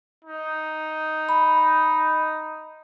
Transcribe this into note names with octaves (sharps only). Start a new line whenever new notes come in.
D#4
B5